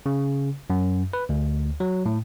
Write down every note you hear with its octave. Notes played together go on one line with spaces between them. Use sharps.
C#3
F#2
B4
D2
F#3
A2